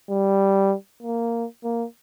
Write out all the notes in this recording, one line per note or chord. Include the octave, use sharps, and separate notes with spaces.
G3
A#3
A#3